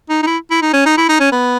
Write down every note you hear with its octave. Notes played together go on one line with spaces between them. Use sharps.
D#4
D#4
E4
E4
D#4
C#4
D#4
E4
D#4
C#4
B3